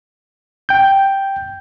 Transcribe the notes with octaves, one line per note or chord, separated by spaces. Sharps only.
G5 G6